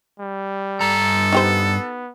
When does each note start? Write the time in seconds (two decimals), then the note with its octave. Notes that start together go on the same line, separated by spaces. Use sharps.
0.20 G3
0.81 G2 A4 A#5
1.33 B3 D#4 G4 C5